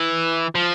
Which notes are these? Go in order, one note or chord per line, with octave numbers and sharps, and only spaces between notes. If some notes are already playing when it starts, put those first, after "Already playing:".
Already playing: E3
F3